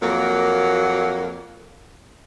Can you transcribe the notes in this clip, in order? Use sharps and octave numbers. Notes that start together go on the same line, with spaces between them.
F2 F#3 A#3